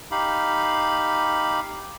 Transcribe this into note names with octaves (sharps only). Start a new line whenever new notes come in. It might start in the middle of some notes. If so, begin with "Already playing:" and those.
D#4 G4 F5 B5